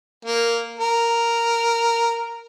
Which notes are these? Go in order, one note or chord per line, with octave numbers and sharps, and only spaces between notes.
A#3
A#4